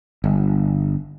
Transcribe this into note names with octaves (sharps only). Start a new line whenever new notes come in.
G1